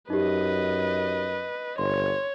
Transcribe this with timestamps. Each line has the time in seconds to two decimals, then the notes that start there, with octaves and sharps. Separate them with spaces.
0.10 F#2 D#4 G4 B4 D#5
1.78 G1 C#5 C6